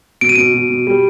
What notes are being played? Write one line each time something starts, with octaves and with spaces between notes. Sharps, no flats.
B2 D7
D#7
B2 D7
B2
B2
G3